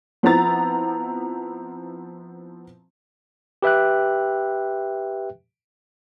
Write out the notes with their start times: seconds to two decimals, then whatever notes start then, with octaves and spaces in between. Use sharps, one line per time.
0.23 F3 B3 C4 E4 A#5 A6
3.63 G4 B4 E5 G5 F#6